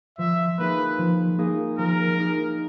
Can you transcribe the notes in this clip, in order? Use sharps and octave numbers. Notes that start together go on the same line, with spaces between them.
F3 E5
A#3 D#4 G#4 B4
F3
A#3 D#4 G#4
F3 A#4
A#3 D#4 G#4